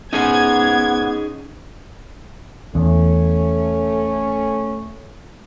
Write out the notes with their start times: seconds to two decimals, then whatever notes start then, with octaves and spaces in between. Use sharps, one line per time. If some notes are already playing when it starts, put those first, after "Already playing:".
0.13 B3 C#4 D#4 G#4 G#5 G#6
2.75 E2 A3 C#4